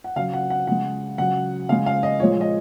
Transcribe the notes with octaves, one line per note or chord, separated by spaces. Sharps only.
F#5
C#3 F#3 F5
F#5
F#5
C#3 G#3 F#5
C#3 F#3 F#5
C#3 G#3 F5
F5
D#5
A#2 F3 G#3 C#5
D#5